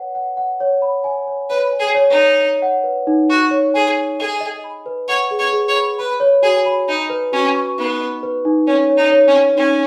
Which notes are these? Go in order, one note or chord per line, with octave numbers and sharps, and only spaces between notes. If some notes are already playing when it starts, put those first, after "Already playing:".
Already playing: B4 C#5 F#5
F#5
F#5
C#5
B5
G#5
C#5
B4 C#5
G#5
G#4
C#5
D#4
C#5
D#5
F#5
B4
D#4
F#4 C#6
C#5
G#4 G#5
G#5
G#4 D#5
D#5
B5
B4
C#5 F#5
G#4
C#5
G#4
C#5
B5
B4 B5
C#5
F#4 G#4
B5
D#4 G#5
B4
C#4 F#4
C#6
B3 D#4
D#5
B4
D#4
C#4 C#5
C#5
D#4
C#5
C#4
C#5
C#4 D#4